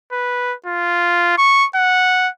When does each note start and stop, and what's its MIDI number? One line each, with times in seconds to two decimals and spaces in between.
0.12 0.54 71
0.66 1.33 65
1.38 1.66 85
1.76 2.29 78